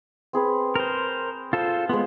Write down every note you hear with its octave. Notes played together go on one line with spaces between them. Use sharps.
C4 G#4 B4
A#4 C5
F4 A4 C5
G#3 B3 F4 G#4 C5